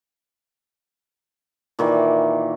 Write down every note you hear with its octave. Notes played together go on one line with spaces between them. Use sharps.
A#2 D#3 E3